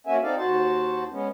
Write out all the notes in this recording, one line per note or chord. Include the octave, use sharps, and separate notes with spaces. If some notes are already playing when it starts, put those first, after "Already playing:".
A#3 C#4 F#4 E5 G#5
C4 D#4 A4 D5 F5
D#2 F#4 C5 A5
G#3 B3 C#4